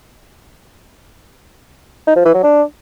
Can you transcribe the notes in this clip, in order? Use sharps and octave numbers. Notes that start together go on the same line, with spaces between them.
D#4
F3
E3
F#3
D4